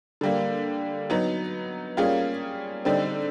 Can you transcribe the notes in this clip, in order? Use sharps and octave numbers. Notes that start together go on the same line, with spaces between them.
D3 G3 A#3
F#3 B3 D#4
G3 A#3 C#4 F4 G#4
D3 G3 C4 D#4